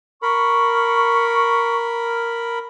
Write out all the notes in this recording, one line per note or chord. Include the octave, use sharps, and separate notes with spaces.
A#4 B5 C#6